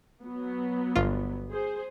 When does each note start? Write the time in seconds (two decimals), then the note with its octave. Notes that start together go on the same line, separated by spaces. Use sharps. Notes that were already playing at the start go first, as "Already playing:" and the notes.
0.23 F#3 B3
0.96 G1 F4
1.51 G#4 C5